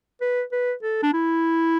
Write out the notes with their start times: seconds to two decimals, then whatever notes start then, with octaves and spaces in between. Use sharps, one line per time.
0.21 B4
0.52 B4
0.83 A4
1.03 D4
1.13 E4